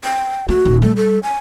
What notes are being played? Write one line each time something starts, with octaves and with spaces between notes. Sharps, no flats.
G5
A3 F#4
D#1
G3 A3
A4
G#5